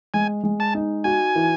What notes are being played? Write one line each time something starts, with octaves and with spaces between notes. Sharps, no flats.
G#3 G#5
G#3
A5
D#4
F#4 G#5
E3